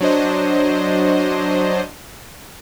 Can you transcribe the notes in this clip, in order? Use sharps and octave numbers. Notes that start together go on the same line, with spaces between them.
F#3 D4 C5 D#5